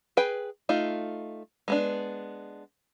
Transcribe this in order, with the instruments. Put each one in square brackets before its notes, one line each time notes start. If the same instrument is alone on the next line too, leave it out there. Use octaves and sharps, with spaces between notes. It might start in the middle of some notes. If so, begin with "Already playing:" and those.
[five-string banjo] G#4 B4 G5
A3 D#4 F4
G#3 B3 D4